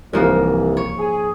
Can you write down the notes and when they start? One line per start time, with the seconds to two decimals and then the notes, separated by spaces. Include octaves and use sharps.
0.13 C2 G#2 E3 F3 A#3
0.77 C#5
0.99 G#4